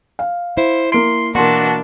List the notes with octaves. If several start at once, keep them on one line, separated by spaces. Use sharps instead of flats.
F5
E4 C5
A#3 C6 D7
B2 E3 A#3 D4 F#4 A#4 C6